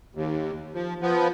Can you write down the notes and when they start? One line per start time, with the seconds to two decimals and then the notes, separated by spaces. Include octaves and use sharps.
0.15 D#2
0.74 F3
1.02 F3 B3